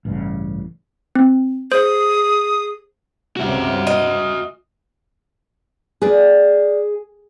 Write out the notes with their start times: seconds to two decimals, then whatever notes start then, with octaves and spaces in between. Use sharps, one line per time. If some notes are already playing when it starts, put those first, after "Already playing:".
0.05 A1 G2 C#3
1.15 C4
1.72 G#4 C5 D#6
3.37 C#2 G2 C3 F#4 E5
3.87 D#5
6.02 D4 G#4 B4 D5